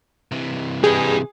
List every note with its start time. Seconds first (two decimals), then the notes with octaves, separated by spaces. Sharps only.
0.31 C3 E3
0.84 G4 G#4 B4